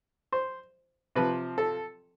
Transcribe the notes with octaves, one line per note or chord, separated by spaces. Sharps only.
C5
C3 F3 B4
A4